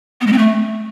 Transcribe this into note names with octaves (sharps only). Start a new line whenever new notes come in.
B3
G#3
C4
A3